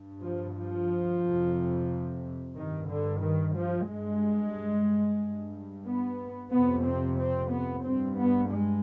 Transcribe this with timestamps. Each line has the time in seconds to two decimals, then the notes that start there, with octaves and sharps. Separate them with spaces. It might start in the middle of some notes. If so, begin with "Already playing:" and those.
Already playing: G2
0.24 F3
0.57 F3
1.24 F2 C3
2.55 G2 D#3
2.88 D3
3.21 D#3
3.55 F3
3.88 G2 G#3
5.21 G2
5.86 B3
6.52 F2 C3 B3
6.85 C4
7.19 C4
7.51 B3
7.85 G2 C4
8.18 B3
8.51 G#3